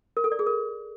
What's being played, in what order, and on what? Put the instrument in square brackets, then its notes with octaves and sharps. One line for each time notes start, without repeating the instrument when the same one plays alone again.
[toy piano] A#4
A4
D5
G#4
A#4